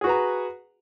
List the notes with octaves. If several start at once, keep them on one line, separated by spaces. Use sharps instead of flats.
F#4 G#4 B4 A#5